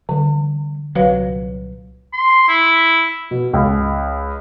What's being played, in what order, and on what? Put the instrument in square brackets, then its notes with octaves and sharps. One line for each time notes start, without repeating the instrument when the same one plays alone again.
[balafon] D3 [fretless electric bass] E3 G3
[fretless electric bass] C2 A#2 F#3 [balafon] B4 F5
[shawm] C6
E4
[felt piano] B2
C#2